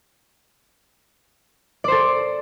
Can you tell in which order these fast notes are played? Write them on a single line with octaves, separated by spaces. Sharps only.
D5 C5 A4